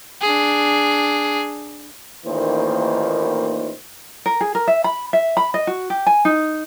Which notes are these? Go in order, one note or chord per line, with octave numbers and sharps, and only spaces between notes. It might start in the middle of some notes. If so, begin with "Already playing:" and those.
D4 G#4
A1 D#2 A#2 D#3 E3 C5
A#4
G#4
A#4
E5
B5
E5
B5
D#5
F#4
G4
G#5
D#4